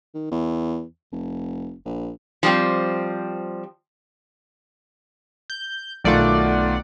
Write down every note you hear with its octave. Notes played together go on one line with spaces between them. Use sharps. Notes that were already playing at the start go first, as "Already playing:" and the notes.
D#3
E2
F1
A#1
F3 G3 C4
G6
B1 D#3 A3 F4 D5 F#5